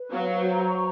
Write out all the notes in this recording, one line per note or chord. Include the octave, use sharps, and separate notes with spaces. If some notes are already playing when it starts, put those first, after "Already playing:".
Already playing: B4
F#3 F5
C5
A#5
C#6